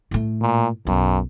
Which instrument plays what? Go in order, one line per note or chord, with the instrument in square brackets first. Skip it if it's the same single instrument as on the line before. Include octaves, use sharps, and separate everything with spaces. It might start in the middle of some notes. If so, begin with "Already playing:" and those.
[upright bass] A2 A3
[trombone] A#2
[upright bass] B1 [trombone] F#2